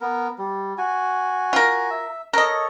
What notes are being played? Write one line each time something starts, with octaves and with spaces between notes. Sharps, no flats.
B3 A#4
G3
F#4 G#5
F4 A#4
E5
A4 A#4 C#5 D#5